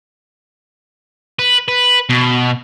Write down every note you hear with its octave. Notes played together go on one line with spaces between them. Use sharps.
B4
B4
B2